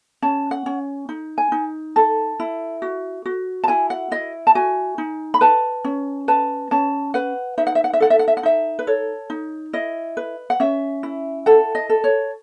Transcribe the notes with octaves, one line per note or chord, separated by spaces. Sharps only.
C#4 A5
F#5
C#4
D#4
G#5
D#4
A4 A5
E4
F#4
F#4
A5
E4 G#5
F#5
E4 D#5
A5
F#4 G#5
D#4
B5
B4 A5
C#4
B4 A5
C#4 A5
B4 F#5
D#4 E5
F#5
E5
F#5
E5
A4 F#5
E5
F#5
E5
F#5
D#4 E5
B4
A4 C#5
D#4
E4 D#5
B4
F#5
C#4 E5
E4
A4 F#5
D#5
A4
C#5